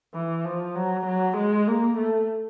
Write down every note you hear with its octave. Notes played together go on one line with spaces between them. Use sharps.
E3
F3
F#3
F#3
G#3
A#3
A3